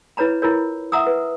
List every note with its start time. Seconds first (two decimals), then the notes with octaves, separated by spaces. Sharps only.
0.17 E4 B4 C#5 A#5 B5
0.42 E4 F4 A#4 C#5
0.92 E5 F#5 A#5 D#6 E6
1.07 B4